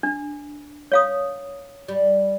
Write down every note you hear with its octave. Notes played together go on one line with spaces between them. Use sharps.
D4
C#5 F5 D#6
G3